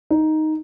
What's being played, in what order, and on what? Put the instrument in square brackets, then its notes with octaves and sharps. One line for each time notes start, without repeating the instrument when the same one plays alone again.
[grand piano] D#4